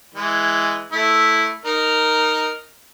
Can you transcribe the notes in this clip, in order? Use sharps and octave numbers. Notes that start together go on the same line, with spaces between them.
E3 G#3
A3 E4
D#4 A#4